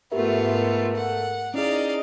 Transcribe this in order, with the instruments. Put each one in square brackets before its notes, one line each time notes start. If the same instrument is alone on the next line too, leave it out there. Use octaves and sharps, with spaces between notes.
[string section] G#2 A3 [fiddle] B3 F4 [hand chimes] G4 A#4 E5
[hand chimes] A#4
[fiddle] F#5
[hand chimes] C#4 E4 G#4 [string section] D#4 A#4 D#5 [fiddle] D5 F5